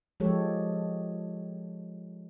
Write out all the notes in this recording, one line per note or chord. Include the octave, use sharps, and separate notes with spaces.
F3 G#3 G4 A4 C#5